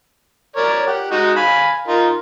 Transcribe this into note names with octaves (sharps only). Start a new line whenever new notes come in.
A#4 C#5 D5
G4 F#5
G#3 D#4 F#4
F5 G#5 B5
D#4 F4 A#4